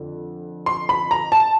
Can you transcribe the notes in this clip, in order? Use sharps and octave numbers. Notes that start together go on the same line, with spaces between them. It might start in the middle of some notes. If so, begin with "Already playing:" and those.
Already playing: F2 D3
C6
B5
A#5
A5